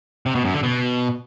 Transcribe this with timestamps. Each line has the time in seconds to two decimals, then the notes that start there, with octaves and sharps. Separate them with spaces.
0.26 C3
0.35 B2
0.45 F#2
0.54 D3
0.63 B2